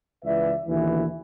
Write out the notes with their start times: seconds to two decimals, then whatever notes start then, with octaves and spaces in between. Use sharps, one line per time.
0.25 C#2 E3 B4 D5 E5
0.68 D#2 B2 D3 E3